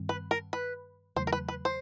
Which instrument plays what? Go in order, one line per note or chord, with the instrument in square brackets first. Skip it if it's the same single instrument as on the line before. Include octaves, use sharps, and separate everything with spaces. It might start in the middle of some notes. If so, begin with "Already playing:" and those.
Already playing: [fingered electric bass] G2 D#3 G3 C4
[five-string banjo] B4
A#4
B4
[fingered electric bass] E2 C#3 F#3 A3 [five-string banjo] C5
[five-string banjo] A#4
B4
B4
C5